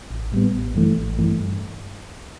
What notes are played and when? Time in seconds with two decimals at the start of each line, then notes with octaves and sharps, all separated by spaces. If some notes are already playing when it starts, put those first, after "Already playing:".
0.10 A1
0.32 A2 G3 B3
0.54 A1
0.75 G2 E3 A3
0.97 A1
1.19 G2 E3 A3
1.40 G2